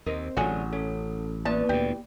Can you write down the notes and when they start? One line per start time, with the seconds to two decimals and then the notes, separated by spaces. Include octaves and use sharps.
0.06 D#2 C4 A#4 D#5
0.37 A1 D3 F#3 F4 F#4 G#4
0.73 C#4 A4
1.45 E2 E3 A#3 B3 D5 A5
1.69 D2 A#2 G4